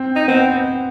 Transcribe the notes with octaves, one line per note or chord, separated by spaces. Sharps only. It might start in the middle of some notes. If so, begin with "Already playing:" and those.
Already playing: C4
D#4
B3 C4